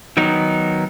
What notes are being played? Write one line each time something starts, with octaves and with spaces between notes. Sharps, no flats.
D#3 F#3 B3 D#4